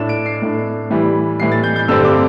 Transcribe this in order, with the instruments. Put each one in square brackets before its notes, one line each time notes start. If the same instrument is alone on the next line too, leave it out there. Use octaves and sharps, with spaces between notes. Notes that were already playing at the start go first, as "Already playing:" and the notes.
Already playing: [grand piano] A2 A3 D4 E7
D7
C7
A2 A3 D4
A2 E3 G3
A2 E3 G3 C7
A6
G6
G6
G2 D3 G3 C4 E6
D6